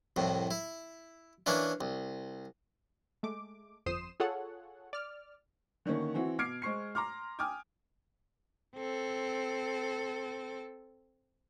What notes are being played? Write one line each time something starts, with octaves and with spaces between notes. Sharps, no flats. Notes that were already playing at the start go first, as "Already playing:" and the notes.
C2 F2 A2
E4
E3 A#3 C#4 D4 E4
C2
G#3 A3 D6
G1 F2 C5 D#6 C7 E7
F4 G#4 A4 C#5 F#5
D5 F6
D3 D#3 A#3 C#4
E3 C4 E4 F#4
B2 D6 F6 G#6 C7 D7
G#3 C5 C#6 C7
A#5 C6 D6 F6
G5 G#5 D6 D#6 F6
C4 A4